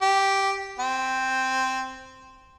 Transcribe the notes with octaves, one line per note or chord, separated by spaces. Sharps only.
G4
C4